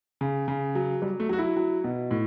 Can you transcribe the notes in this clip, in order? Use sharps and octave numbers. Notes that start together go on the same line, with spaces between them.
C#3
C#3
F#3
F#3 G3
A3
F#3 F#4
E4
F#3
B2
A2